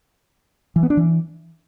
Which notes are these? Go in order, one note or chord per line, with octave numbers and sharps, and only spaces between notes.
E3
B3
D4
E3